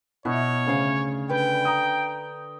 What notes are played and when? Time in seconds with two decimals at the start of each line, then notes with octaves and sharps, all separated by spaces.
0.25 B2 E4 C#5
0.66 D2 C#3 C#4 F5
1.29 D3 B4 G5
1.65 A#5 D#6